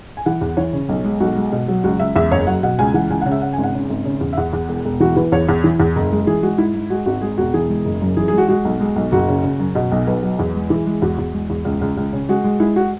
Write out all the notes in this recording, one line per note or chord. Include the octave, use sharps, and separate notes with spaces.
G#5
E3 F#5
E2
E3 C#5
C#3
B1
G#3
B1 F#4
G#3
B2
F#3
C#2 F#4
C#2 E5
E2 E5
F#1 C#5
F#3 F#5
B2 F#5
C#2 G#5
E3 F#5
C#2 G#5
C#3 F#5
E5
C#3 F#5
G#1 G#5
F#5
C#3
G#1
C#3
E2
E5
E2 F#5
E2
E1
E1
E3 F#4
E3 B4
E2 C#5
E2
E3
E2
F#1
G#3
E3 G#4
G#3 F#4
G#2 E4
G#2
G#3 F#4
G#1 F#4
G#3 G#4
E1 F#4
E3 G#4
G#3
F#1
F#2
E3 G#4
G#3 G#4
F#4
G#3 F#4
B1
G#3
B1
F#1 F#4
C#3
C#3
F#2
B2
B1
B1 B4
F#3
E2
G#3
E3 G#4
G#3
E2 F#4
E2
G#3
E2
C#2
C#2
C#2
C#3
G#3 F#4
G#3
G#3 E4
F#4